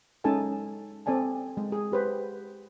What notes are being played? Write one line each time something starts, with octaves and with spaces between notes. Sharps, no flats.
G#3 C#4 D#4 A4 G#5 A5
C4 A4 D5 G#5 A5
G#3
G#4
G4 B4 C5